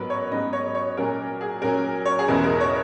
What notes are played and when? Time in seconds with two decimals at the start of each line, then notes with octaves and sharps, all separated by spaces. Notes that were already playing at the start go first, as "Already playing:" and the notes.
Already playing: G#2 F#3 B3 D#4 A#4 B4
0.10 C#5
0.31 G#2 F#3 B3 D#4 D#5
0.53 C#5
0.75 C#5
0.97 A#2 F#3 C#4 A#4
1.41 G#4
1.62 A#2 F#3 C#4 A#4
2.05 C#5
2.19 G#4
2.28 E2 B2 G#3 C#4 E4 A#4
2.44 A#4
2.60 C#5